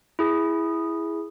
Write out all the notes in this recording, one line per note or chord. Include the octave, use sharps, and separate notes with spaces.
E4 G#4